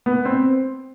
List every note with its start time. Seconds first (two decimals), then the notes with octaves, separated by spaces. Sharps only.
0.06 B3
0.25 C4